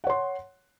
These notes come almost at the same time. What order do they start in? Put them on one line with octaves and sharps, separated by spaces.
F#5 C#5 C6